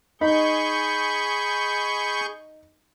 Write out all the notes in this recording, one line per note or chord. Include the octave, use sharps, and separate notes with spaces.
D#4 G#4 B5 C#6 G6